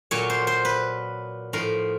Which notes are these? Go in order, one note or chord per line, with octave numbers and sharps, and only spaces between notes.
A#2 F#3 C#5
C5
C5
B4
A2 F3 A#4